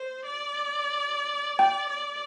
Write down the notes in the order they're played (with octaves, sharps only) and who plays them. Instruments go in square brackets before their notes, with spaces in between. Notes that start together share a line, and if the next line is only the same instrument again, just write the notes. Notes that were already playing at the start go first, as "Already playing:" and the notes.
Already playing: [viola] C5
D5
[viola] D5 [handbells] G5
[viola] D5